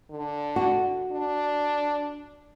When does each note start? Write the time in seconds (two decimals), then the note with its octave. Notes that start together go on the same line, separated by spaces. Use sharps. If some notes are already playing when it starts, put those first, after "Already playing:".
0.10 D3
0.56 F#4
1.12 D4